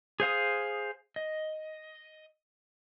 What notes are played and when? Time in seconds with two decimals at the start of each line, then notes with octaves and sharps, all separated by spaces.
0.20 G#4 C5 F5 D#6
1.16 D#5